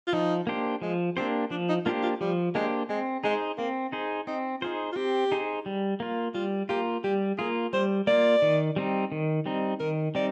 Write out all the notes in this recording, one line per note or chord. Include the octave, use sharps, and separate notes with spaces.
F4
F3 D#4
A#3 D4 G4 C5
F3 G#3
A#3 C4 D4 G4 C5
F3 D4
D#4
A#3 D4 F4 G4 C5
F4
F3 G3
G#3 A#3 D4 G4 C5
G#3 C4
G#3 D#4 G#4 C5
A#3 C4
D#4 G#4 C5
C4 D#4
D#4 F4 G#4 C5
F4
C4 G4
D#4 G#4 C5
G3
A#3 F4
G3 F4
A#3 F4 G4
G3 G4
A#3 F4 G#4
G3 C5
A#3 F4 D5
D#3
G3 C4 D#4
D#3
G3 C4 D#4
D#3 A#4
G3 C4 D#4 D5